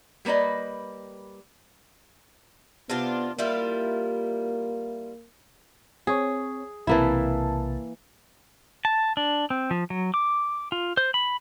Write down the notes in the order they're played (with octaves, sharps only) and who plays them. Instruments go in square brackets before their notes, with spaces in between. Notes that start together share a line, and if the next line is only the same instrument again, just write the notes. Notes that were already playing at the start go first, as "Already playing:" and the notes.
[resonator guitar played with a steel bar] G3 A#3 B4 D5 D#5
[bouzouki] C3 D4 F4 [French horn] B3
[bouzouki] G3 E4 F4 [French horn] A#3
[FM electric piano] C4 C#5 [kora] G#4
[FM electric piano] B1 C3 A5 [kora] E3 A#3 E4
[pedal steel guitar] A5
D4
C4
F3
F#3
D6
F4
C5
B5